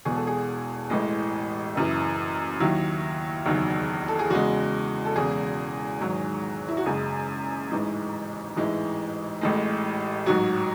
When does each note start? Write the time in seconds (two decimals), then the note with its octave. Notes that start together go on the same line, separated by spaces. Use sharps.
0.05 E1 E2 B2 G#4
0.15 A4
0.27 G#4
0.90 A1 A2 E3 G#3
1.75 F#1 F#2 E3
2.60 D#2 D#3 F#3 E4
3.46 F#1 E2 D#3 F#3
4.08 A4
4.19 G#4
4.30 E2 C#3 G#3 F#4
5.05 A4
5.16 E1 E2 C#3 G#4
6.01 G#1 G#2 D#3 F#3
6.68 E4
6.77 F#4
6.86 F#1 F#2 C#3 G#3 G#4
7.70 A1 G#2 E3 G#3
8.56 A1 G#2 E3 G#3
9.41 A1 A2 G#3
10.26 A1 G#2 F#3 F#4